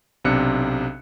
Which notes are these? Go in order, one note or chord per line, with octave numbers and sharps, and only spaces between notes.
B1 C3 D4 F#6 C#7